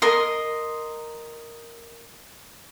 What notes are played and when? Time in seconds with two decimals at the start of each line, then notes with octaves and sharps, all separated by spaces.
0.02 A#4 D#5 C6